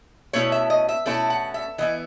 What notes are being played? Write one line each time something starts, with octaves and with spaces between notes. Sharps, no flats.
B2 A3 C#4 E4 C#5
E5
D#5
E5
B2 A3 C#4 E4
F#5
E5
E3 B3 E4 D#5